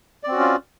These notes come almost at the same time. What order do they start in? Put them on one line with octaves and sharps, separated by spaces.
D5 C4 F#4 C#4 F4